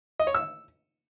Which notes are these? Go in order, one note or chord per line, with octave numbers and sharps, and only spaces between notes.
D#5
C#5
E6